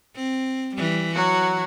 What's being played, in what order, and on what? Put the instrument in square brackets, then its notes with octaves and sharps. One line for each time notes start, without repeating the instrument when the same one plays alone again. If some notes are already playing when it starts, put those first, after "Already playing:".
[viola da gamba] C4
E3 G3
[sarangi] F#3 [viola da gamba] F#4